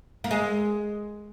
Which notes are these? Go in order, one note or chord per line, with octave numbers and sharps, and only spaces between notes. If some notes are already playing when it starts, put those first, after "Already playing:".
A#3
G#3